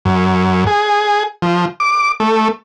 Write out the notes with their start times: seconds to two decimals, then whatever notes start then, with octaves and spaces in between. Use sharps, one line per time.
0.05 F#2
0.67 G#4
1.42 F3
1.80 D6
2.20 A3